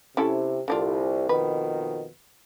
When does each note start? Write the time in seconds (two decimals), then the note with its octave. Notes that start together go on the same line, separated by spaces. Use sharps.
0.17 C3 C#4 E4 A4
0.68 C2 D3 D4 F4
1.29 F2 B2 D#3 B4